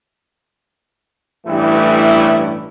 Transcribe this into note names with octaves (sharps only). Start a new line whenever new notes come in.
A1 G2 E3 A3 E4